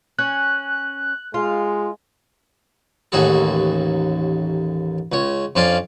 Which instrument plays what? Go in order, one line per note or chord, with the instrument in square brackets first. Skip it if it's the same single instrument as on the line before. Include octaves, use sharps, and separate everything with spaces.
[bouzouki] C#4 [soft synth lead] F#6
[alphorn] G#3 [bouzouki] F4
[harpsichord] A1 D#2 F#4 G#4 A4
C#2 C#5
F2 C#4 D4 F4 D5 F5